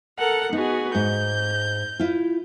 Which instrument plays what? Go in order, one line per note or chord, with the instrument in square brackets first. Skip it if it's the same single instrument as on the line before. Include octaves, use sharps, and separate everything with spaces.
[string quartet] A4 A#4 F#5
[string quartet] B3 F#4 G#4 [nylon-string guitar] D#4
[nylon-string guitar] G#2 [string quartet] G6
[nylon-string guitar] E4 F4